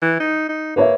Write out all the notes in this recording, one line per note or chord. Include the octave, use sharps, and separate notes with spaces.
E3
D#4
D#4
A#3 B4 C#5 E5